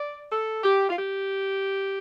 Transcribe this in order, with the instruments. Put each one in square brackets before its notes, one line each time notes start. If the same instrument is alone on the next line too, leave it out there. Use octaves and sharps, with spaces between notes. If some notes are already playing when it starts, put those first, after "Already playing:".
Already playing: [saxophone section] D5
A4
G4
F4
G4